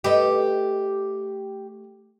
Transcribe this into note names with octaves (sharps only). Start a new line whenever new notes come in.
A3 G4 B4 D#5